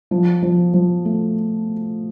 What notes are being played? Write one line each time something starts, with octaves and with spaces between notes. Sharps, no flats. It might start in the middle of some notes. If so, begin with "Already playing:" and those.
F3
F3
F3
A3